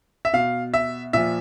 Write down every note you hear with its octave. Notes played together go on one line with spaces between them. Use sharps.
E5
B2 F5
E5
A#2 F3 E5